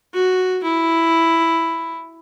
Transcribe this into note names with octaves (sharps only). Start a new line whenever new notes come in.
F#4
E4